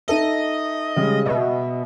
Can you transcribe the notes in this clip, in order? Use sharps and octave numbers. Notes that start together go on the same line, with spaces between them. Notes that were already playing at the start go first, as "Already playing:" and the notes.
D#4 A4 D#5 E5
C#3 G3 G#3
B2 D#5 E5